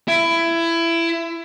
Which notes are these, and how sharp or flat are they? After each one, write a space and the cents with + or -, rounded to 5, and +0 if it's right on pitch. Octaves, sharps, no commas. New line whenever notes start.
E4 +20